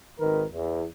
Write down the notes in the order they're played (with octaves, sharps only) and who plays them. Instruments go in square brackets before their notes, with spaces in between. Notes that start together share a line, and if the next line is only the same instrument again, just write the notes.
[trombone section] G#1 D#3 A#4 B4
E2